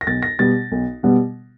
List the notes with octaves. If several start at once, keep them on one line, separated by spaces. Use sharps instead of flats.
A#6
B1 A6
A#6
B2 G3 B3 A6
B1
B2 G3 B3